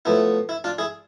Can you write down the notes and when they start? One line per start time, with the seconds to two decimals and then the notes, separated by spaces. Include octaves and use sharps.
0.05 A2 F3 B3 E4
0.49 E4
0.64 D4 F4
0.78 E4 G#4